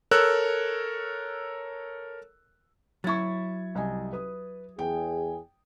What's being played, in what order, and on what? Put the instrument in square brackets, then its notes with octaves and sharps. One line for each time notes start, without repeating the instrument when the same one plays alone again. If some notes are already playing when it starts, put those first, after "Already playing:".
[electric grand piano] A4 A#4 C#5 E6 F#6
[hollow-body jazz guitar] F#3 E4 [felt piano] C#6 G#6 A6
[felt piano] C2 D#5 G#5
B4 D#6
[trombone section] E2 G#4 [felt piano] G5